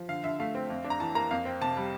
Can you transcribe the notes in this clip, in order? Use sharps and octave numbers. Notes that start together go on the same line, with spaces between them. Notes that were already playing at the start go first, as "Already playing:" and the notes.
Already playing: F3
D3 F5
D3 E5
A3 F5
C4
F2
D4
A#5
E3 A5
A#3 A#5
F2 F5
C4
C3 A5
G3